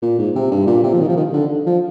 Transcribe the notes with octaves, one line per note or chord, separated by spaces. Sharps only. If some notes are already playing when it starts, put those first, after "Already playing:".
A#2
G#2
C3
G2
A#2
C3
F3
D#3
F3
D#3
D3
F3